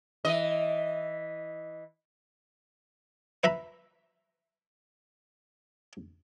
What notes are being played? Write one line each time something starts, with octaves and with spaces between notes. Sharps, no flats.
E3 D#5
B4 E5 A#5 B5